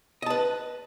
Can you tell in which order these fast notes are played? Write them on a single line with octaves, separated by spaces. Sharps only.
D#5 A5 B4